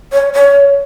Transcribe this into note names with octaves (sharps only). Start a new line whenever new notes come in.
C#5
C#5